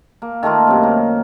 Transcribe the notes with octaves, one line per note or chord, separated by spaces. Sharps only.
A#3
D#3 A3 A#3 F4
F#2 C3
A#3